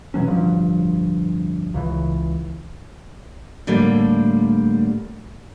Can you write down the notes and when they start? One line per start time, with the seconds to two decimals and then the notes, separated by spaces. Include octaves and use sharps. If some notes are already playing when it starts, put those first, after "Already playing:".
0.14 B2 E3 F#3 C#4
0.28 D1 G2 F3
1.74 C#2 C#3 E3
3.67 A2 D3 G3 A#3